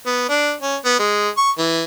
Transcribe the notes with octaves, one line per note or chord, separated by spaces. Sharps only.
B3
D4
C#4
B3
G#3
C#6
E3